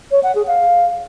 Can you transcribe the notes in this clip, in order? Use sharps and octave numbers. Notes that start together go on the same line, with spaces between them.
C#5
F#5
G#4
F5